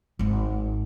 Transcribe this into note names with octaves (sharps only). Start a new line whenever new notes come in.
G#1 G#2